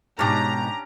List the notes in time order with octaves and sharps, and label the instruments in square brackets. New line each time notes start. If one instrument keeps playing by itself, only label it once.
[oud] G#2 B2 [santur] C#4 D4 G4 [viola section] A#5